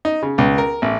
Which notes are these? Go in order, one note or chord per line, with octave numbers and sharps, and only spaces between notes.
D#4
C#3
C#2
A#4
A1